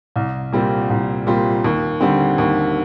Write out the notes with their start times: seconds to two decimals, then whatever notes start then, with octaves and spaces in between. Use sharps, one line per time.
0.16 C2
0.52 A#2 G3 C4 F4
0.90 C2
1.27 A#2 G3 C4 F4
1.64 D#2
2.00 D3 G3 C4
2.38 D#2